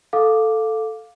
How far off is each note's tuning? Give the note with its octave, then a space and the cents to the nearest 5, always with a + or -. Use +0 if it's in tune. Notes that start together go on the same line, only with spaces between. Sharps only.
A4 +0 F5 +10 D6 +0